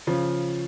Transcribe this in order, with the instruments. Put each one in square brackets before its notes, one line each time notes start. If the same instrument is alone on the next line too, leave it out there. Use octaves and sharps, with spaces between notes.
[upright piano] C#3 F3